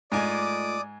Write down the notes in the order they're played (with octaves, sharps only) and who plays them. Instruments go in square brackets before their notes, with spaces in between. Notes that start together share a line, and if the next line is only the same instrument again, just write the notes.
[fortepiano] G#2 G#5 [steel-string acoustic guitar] A3 F4 D#5 [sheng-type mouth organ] D5 D6 D#6